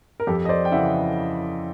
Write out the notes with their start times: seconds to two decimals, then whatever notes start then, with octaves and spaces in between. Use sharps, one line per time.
0.20 A#4
0.27 F2 G4 A4
0.45 D#5
0.49 C5 D5
0.65 G5
0.71 C#3 E3 E5 F#5